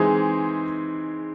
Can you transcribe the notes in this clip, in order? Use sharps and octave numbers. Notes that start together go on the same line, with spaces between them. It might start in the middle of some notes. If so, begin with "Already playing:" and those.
Already playing: E3 G#3 C4 D#4 G#4